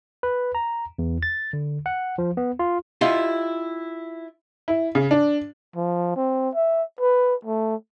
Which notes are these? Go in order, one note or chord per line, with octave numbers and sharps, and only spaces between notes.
B4
A#5
E2
A6
D3
F#5
F3
B3
F4
E4 F4 G4 D#5 F5
E4
C#3
D4
F3
C4
E5
B4
A3